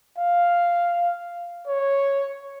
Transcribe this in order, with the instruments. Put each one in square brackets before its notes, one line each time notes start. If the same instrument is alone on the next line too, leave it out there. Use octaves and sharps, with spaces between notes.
[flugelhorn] F5
C#5